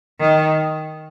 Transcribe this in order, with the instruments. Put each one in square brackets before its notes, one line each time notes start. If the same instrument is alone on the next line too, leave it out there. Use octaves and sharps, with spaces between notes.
[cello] D#3